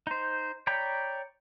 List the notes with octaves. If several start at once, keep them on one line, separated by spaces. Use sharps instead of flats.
D#4 C5
C#5 D5 G5 A#5 B5